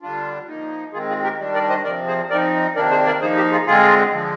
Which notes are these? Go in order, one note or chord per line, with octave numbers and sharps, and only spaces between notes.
D3 G3 D4 F4
F3 A#3 D#4
D#3 G#3 C4 F4 G#4
F4 G#4
G4 A#4
D#3 G3 D4
A#4 D5
C5 D#5
C3 F3 C4 A#4 D5
G#4 C5
F3 C4 D#4 A#4 D5
C3 D#3 A#3 D4 A#4 D5
G#4 C5
A#4 D5
F3 A#3 D#4 G#4 C5
G4
F4 G#4
D3 G#3 C4 F4 G#4
D3 F3 G#3